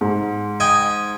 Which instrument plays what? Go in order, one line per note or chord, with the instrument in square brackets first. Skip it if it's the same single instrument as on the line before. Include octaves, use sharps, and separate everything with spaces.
[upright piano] G#2
[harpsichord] D#5 G5 G#5